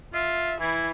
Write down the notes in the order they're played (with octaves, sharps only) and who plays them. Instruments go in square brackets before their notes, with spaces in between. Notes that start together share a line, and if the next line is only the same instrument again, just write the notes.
[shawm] F4 [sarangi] E5
[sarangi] E3 [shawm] E4